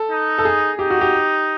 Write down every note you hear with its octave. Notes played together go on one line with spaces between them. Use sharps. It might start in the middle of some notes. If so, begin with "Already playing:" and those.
Already playing: A4
D#4
A4
G#4
D#4 G4
F#4
G4